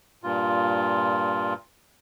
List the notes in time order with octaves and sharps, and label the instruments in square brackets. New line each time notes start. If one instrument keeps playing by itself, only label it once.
[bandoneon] G2 A#2 F4